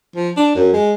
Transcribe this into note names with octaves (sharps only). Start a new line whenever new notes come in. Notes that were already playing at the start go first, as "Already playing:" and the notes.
F3
D4
F#2
G#3